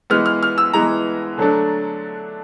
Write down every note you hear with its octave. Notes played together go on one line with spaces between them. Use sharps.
E3 G#3 B3 F6
F6
F6
E6
E3 G#3 B3 A#5
D3 F#3 A3 D4